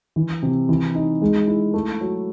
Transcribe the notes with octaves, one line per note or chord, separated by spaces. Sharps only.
E3
C3
E3
D#4
G#3
E4
A3
F#3